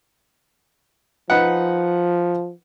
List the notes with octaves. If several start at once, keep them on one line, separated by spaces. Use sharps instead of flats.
F3 D#4 B4 F#5